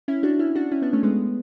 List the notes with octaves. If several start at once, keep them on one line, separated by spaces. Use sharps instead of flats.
C#4 E4
D4 F#4
C#4 E4
D4 F#4
C#4 E4
B3 D4
A3 C#4
G#3 B3